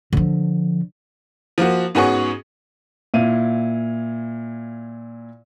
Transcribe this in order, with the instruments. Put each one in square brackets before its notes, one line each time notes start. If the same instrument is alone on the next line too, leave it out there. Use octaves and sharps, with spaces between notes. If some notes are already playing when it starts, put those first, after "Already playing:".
[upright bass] D3 F3
[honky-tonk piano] F3 A#3 F#4
G#2 B3 C#4 F#4 G#4 C#6
[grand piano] A#2 E4 F5 D#7